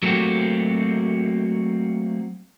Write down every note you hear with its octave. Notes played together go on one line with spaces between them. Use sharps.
F#3 A3 A#3 C4 F#4 G4